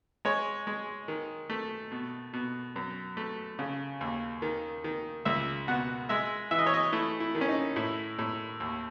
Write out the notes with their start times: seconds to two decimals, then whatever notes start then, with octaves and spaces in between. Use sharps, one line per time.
0.25 G#3 C#5
0.67 G#3
1.08 D#3
1.50 A3
1.92 B2
2.33 B2
2.76 F#2
3.17 A3
3.59 C#3
4.01 D#2
4.42 D#3
4.84 D#3
5.25 C#2 E5
5.68 B2 F#5
6.09 G#3 E5
6.51 E3 E5
6.59 D#5
6.66 C#5
6.74 D#5
6.93 A3 E4
7.20 E4
7.35 D#3
7.41 C#4
7.48 D#4
7.76 A2 E4
8.19 A2
8.60 D#2